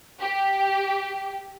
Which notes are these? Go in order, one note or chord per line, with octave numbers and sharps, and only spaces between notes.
G4